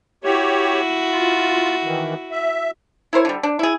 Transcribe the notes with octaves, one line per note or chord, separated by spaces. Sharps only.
E4 F#4 G4 C#5
F4
D#3 E3
E5
E4 A#4 C5 C#5
D3 G3
D4
E4 G#4